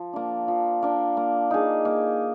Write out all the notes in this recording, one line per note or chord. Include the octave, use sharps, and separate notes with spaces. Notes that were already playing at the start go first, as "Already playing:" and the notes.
Already playing: F3
A#3 D4
F3
A#3 D4
A#3
D#4 G#4
A#3